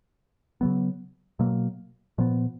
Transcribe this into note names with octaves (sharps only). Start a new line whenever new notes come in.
C#3 F#3 B3
B2 F#3 A#3
A#2 F3 B3